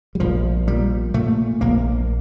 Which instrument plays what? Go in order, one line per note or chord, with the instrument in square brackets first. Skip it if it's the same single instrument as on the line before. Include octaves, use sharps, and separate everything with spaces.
[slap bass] G3
A#1 F3
A#2 G3
A#2 A3
A#1 A#3